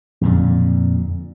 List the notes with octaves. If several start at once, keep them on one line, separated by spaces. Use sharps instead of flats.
F2 A#2 D3